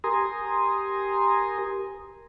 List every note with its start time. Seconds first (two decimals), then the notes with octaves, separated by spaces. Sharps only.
0.04 G4 A#4 G#5 A#5 C6 D#6